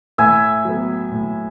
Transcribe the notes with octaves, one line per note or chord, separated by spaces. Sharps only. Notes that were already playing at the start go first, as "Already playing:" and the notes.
A2 E5 G#5
F#3 B3
A2